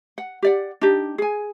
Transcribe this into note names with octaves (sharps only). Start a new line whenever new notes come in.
F#5
G4 D5 F#5
D4 D#4 G4
G#4 G#5